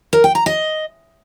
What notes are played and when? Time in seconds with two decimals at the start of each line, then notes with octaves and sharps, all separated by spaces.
0.13 A#4
0.24 G5
0.35 A#5
0.46 D#5